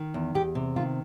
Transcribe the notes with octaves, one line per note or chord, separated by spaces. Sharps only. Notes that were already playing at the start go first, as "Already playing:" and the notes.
Already playing: D#3
E2
E2 G4
C3
D#3 F4